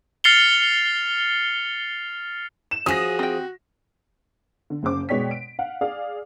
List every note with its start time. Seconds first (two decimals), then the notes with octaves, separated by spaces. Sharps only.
0.24 F6 A6 C7 C#7 F7 G7
2.71 E7
2.86 F3 C#4 F#4 G#4 D#6 A#6
3.19 C4 G5
4.70 D3
4.83 F#1 C#3 C5 D6
5.09 B2 G#3 C#5 D5 G5 B6
5.31 D7
5.59 F5 F#5
5.81 G#4 D5 F5